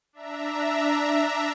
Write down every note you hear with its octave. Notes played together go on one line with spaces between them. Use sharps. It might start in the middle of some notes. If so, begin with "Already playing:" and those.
D4 E5 A#5